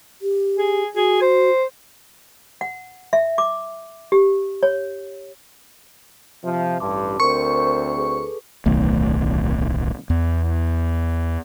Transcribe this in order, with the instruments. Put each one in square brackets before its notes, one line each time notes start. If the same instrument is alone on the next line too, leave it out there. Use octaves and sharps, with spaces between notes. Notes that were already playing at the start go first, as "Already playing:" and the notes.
[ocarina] G4
[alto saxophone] G#4
[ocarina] F#4 [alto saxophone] G#4
[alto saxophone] C5
[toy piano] F#5
E5
D6
G4
C#5
[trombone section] C3 F3 [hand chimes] E5
[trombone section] A1 G2 [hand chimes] A5 C6 D6
[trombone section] D2 C4 C5 [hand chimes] A#4 C6 [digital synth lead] C#6
[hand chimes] G#4 A4 B4
[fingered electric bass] D1 B1 D#3 A3
E2